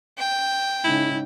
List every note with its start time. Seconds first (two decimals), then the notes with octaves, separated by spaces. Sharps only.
0.19 G5
0.84 G#2 C#3 E4